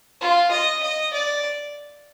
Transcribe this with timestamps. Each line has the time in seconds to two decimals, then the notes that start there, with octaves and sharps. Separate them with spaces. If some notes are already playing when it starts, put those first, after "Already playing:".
0.21 F4
0.52 D#5
0.82 D#5
1.14 D5